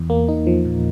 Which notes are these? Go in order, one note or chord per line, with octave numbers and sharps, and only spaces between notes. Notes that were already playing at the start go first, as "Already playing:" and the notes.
Already playing: E2
A#3
D#4
F3
A#2